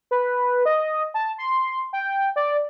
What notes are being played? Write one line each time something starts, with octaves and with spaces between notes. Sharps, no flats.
B4
D#5
A5
C6
G5
D5